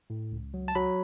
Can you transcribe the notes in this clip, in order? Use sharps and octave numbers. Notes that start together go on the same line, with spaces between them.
A2
C#2
F#3
A5
F#3 B5